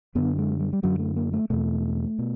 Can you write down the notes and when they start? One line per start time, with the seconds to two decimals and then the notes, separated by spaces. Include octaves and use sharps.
0.15 F#2 D3 B3
0.38 G#3
0.60 G3
0.73 G3
0.83 F#2 D3 F#3
0.99 A3
1.16 A#3
1.33 A3
1.50 E2 B2 A3
2.19 B2